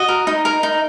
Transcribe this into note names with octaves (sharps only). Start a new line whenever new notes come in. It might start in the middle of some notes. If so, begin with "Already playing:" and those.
Already playing: F#4 D#5
A#4
D#4
A#4
D#4